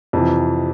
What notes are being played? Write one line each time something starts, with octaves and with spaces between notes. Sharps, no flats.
F2 C3 E3